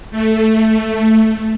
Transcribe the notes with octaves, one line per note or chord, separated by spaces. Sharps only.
A3